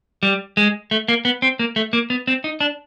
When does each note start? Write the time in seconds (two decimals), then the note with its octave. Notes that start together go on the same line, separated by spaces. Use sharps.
0.23 G3
0.57 G#3
0.91 A3
1.08 A#3
1.25 B3
1.42 C4
1.59 A#3
1.76 A3
1.93 A#3
2.10 B3
2.27 C4
2.44 D#4
2.60 D4